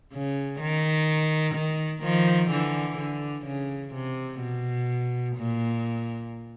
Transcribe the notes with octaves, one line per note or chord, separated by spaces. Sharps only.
C#3
D#3
D#3
D#3 F3
D3 E3
D3
C#3
C3
B2
A#2